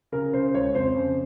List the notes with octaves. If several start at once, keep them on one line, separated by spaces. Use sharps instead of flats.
C#3 A#4
C#3 C5
C5
C#2 C#5
F2 C5
C#3